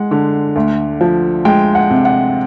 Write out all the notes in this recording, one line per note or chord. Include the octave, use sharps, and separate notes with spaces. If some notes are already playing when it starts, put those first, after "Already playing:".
Already playing: G#3 F#5
D3
D2
F3
G#3 G5
F#5
C3
F#5